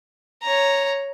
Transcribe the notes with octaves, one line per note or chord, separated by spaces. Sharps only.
C#5 A#5